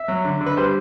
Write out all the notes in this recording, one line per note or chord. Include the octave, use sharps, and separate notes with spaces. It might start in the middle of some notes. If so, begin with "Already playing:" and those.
Already playing: E5
F#3
D3
D3
B4
G3 C5